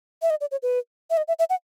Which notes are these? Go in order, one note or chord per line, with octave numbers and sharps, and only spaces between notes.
E5
D#5
D5
C#5
B4
E5
D#5
E5
E5
F#5